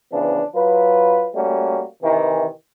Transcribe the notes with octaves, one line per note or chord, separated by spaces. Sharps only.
C#3 E3 F3 B3 D4
F#3 F4 B4
G3 A3 A#3 C#4 F#4
C3 D#3 E3